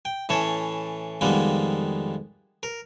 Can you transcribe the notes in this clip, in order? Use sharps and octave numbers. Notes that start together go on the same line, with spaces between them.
G5
A2 E3 C#4 C#5 A5
F2 D#3 G3 G#3 A#3 B3
A#4